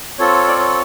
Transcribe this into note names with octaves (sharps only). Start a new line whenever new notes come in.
C4 F4 A4 C#5
D5
C#5